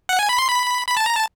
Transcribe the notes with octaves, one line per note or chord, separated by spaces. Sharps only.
F#5
G#5
B5
C6
B5
B5
A5
A#5
A5